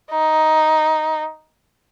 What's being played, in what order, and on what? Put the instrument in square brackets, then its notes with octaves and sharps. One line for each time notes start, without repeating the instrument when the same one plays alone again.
[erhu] D#4